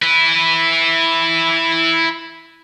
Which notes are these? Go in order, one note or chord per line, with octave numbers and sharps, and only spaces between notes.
E4 B4